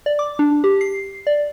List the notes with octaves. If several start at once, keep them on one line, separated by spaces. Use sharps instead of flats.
D5
D6
D4
G4
C7
D5